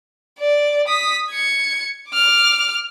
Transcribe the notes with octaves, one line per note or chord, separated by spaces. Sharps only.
D5
D#6 B6
G#6 C#7
D6 F6